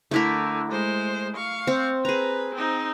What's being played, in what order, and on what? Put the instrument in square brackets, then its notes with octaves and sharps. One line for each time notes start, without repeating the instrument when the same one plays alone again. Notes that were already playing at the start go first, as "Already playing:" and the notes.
[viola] D3 [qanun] A3 E4 A#4
[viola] G#3 C5
F5 C#6
[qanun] C4
[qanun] G#4 A#5 [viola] B4
[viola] C4 D#4